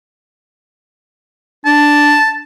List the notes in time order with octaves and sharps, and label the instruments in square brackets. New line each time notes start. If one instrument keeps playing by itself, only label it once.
[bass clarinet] D4 [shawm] A5